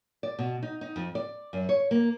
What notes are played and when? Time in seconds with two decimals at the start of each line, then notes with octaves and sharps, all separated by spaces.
0.23 D5
0.39 B2
0.62 D#4
0.81 D#4
0.96 F2
1.15 D5
1.53 F#2
1.69 C#5
1.91 A#3